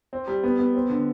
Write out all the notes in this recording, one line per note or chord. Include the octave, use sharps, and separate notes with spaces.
C4
G3
B3
B3
C4
D3